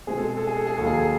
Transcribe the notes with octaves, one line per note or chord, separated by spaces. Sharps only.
B2 G#3 C4 G#4
A4
G#4
A4
G#4
A4
G#4
D#2 D#3 F#3 A4
G#4
A4